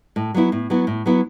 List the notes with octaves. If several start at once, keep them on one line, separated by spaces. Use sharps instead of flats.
A2
F#3 B3 E4
A2
F#3 B3 E4
A2
F#3 B3 E4